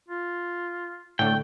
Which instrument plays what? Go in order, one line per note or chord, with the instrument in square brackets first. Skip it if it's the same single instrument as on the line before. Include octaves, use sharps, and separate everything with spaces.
[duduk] F4
[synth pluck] A2 D3 [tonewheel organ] A3 [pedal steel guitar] G5